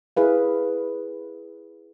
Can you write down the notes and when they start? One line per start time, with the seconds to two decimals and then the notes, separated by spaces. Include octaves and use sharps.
0.17 E4 G#4 B4 F5